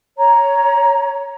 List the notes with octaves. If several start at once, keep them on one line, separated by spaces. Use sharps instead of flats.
C#5 A#5